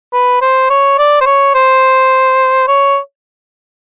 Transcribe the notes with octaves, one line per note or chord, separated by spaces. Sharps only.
B4
C5
C#5
D5
C5
C#5
C5
C#5